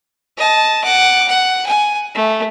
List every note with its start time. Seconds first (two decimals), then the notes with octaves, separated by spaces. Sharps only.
0.37 D#5 A5
0.84 F#5 D6
1.28 F#5
1.66 G#5
2.15 A3